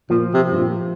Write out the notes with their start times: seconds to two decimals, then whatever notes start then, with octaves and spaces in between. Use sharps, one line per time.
0.10 A#2 F3
0.34 C3
0.52 G2
0.58 A#2